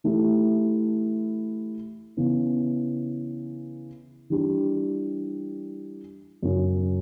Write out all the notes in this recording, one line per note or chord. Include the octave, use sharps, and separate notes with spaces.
E3 A3 E4 G4
C#3 E3 B3
E3 G3 D4 G4
F#2 C#3 F#3 C#4